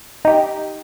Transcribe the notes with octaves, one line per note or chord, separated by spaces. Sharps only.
D#4 G4